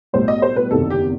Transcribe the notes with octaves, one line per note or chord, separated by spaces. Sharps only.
B1 A2 G3 C5
D#5
C5
B4
F#1 E2 C3 D#3 A4
G4